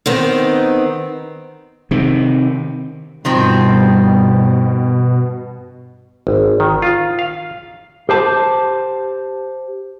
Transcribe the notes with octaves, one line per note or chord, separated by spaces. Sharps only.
D#3 B3 C4
C3 D#3
G2 B2 D#3 F3 G3 C4
G#1
D#3
F4
F5
G4 C5 A5